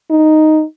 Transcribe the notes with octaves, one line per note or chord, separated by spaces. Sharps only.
D#4